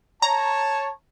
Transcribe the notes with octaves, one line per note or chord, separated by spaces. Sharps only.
C#5 A5 A#5